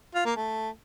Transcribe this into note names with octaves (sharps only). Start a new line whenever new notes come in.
F4
A#3
A3